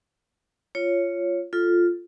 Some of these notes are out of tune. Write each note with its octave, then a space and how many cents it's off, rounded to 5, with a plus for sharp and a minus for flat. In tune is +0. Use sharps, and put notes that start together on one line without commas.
F4 -10 C#5 +0
F4 +0 A4 +0